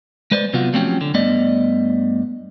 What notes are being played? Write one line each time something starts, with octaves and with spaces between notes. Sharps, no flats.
G#3 B4 C5 D5
C3 F#3 B3 F4 F#4
F3 F#3 A3 C4 C#4 G4
D3
G2 A3 B3 D5 D#5